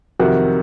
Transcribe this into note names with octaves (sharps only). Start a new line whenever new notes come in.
F2 C3 D#3 F#3 F#4